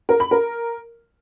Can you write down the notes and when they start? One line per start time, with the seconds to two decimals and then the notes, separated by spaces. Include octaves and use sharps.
0.09 A#4
0.20 B5
0.31 A#4